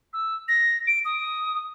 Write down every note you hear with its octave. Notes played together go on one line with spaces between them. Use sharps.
E6
A#6
D7
D#6